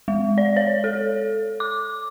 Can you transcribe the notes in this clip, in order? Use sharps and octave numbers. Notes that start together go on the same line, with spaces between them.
G#3
D5
C#5
A4
D6